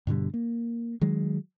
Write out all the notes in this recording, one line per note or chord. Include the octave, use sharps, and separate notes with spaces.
G2 B2 D3 G3
A#3
D#3 F#3 G#3